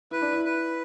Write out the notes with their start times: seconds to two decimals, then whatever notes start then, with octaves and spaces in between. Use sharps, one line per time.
0.11 E4 B4
0.22 D4
0.33 E4
0.45 B4